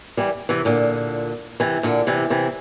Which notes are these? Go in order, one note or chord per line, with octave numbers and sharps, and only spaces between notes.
E3 G3
C3 E3
A#2 D3
C3 E3
A#2 D3
C3 E3
C3 E3